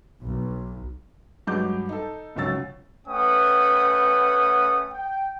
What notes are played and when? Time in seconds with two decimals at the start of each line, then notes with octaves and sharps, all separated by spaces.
0.23 B1
1.47 G2 F#3 G#3 D6 G6
1.89 D#4 A4
2.36 F1 C#2 F#3 C#4 E6 A6
3.07 A3 C#4 B4 F#5 G5 D#6
4.91 G5